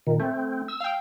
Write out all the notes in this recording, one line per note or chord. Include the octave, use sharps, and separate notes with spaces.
A#2 D#3
A3 C4
E6
F5 G5